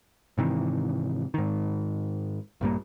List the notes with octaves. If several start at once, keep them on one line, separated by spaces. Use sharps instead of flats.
G#2 C3 D#3 E3
G#2 D#3
A#1 G2 G3 A#3